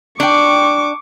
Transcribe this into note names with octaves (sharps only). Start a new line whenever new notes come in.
D4 G5 C#6 D6